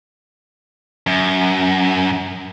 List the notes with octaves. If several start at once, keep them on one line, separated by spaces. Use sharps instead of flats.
F#2